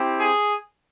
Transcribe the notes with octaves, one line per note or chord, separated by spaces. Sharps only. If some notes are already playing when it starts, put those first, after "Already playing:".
Already playing: C4 E4 G4
G#4